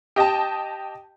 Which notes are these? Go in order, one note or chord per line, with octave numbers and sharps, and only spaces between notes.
G4 D#5 G5 A5